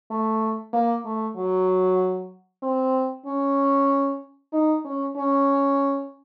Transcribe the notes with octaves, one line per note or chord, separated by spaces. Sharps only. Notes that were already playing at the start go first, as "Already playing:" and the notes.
A3
A#3
A3
F#3
C4
C#4
D#4
C#4
C#4